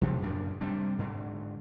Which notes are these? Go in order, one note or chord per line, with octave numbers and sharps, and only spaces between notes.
B2 F3
F#2 A#2 C#3 D4
C3 G3 C4 D4
G#2 D3